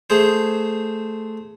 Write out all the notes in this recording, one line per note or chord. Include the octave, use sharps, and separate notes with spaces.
A3 G#4 C5